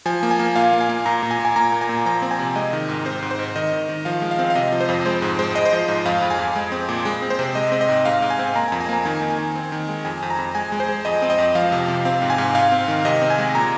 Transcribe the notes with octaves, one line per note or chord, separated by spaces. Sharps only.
F3 G#5
A#3
G#5
A#3
A#2 F5
A#3
G#5
A#3
A#2 A#5
A#2
G#5
A#2
G#5
A#3 A#5
A#2
G#5
A#2
F3 A#5
C4
G#5
C3
G#3 D#5
D#3
G#2
C4 C5
G#2
C5
G#2
D#3 D#5
D#3
D#3
F3 F5
G#3
F5
C4
F5
C3 D#5
F3
C5
F2
G#3 C5
G#2
G#3 C5
G#3 D#5
C5
F3 D#5
G#2
F2 F5
F2
G#5
F2
G#3
C4
A#2
G#3
C4
C5
C3
G#3 D#5
C4
D#5
G#2
G#2 F5
G#2
G#5
C4
A#3 A#5
G#5
F2
G#5
A#3 A#5
D#3 G#5
D#3
G#5
D#3
C4
D#3
G#3
F2 G#5
F2
A#5
F2
G#3 G#5
G#3
C5
G#3
F2 D#5
C4
D#5
F2
F3 F5
C3
C3
C4 F5
G#2
G#5
G#2
G#2 F5
C4
D#3
C3 D#5
C4
G#5
G#3
A#2 A#5